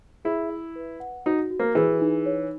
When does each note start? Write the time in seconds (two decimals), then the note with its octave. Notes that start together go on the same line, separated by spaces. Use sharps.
0.25 E4 G#4
0.50 E5
0.76 B4
1.00 F#5
1.26 D#4 F#4
1.51 F#4
1.60 A#3
1.75 E3 G#4
2.01 D#4
2.26 C#5